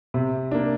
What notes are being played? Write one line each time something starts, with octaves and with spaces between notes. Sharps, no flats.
C3
A#3 D4